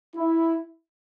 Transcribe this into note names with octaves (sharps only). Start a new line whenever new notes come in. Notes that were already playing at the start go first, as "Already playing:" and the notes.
E4